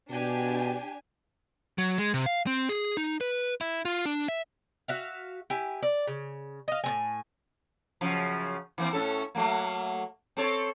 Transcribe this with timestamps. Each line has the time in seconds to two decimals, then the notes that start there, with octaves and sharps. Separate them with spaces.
0.11 B2 D4 G4 G#5
1.78 F#3
1.98 G#3
2.14 C3
2.26 F5
2.47 C4
2.69 G#4
2.97 D#4
3.21 B4
3.61 E4
3.85 F4
4.06 D4
4.28 E5
4.88 F#4 E5 F5
5.50 E4 G4 G#5
5.83 D5
6.07 C#3
6.68 D#5 F5
6.84 A2 C4 G#5
8.01 F#2 C#3 F3
8.78 E3 A#3 C4
8.93 A2 C#4 A4
9.35 F#3 A3 A#3
10.37 C4 A4 C#5